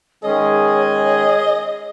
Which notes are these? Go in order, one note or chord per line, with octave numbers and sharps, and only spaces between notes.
D#3 G#3 C#4 G#4 C#5 D#5